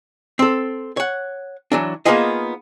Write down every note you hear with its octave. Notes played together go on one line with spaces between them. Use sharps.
C4 A4
C#5 F#5
E3 F#3 D4
A#3 B3 D#4 F4 G#4 D#5